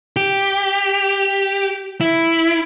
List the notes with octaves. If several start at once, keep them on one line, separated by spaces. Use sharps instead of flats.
G4
E4